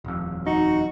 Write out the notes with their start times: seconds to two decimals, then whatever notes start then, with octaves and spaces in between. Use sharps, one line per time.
0.04 D#1 F2
0.47 D#4 F#4